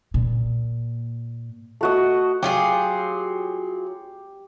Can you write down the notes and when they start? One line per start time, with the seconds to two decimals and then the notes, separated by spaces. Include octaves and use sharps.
0.14 A#2
1.81 A3 F#4 D#5
2.43 F#3 F4 G4 G#4